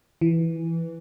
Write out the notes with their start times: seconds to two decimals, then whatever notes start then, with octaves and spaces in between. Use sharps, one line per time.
0.21 E3